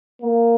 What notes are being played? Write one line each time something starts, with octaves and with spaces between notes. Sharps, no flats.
A#3